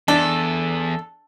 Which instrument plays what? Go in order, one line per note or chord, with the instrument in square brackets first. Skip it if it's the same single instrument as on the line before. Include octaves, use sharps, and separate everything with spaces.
[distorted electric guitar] E2 [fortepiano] D4 [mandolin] A4